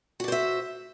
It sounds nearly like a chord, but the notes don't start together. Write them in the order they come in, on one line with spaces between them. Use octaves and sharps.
F#4 D5 C5 E5